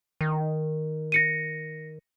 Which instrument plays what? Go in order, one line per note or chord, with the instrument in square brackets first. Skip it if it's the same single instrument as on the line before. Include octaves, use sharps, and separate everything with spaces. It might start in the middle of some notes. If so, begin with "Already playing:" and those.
[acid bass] D#3
[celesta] A#6 C#7 D#7